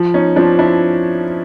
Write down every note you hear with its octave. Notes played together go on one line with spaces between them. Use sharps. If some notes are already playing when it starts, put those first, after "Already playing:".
Already playing: F3
C#4 D#4
F3 C4 D4
D4 E4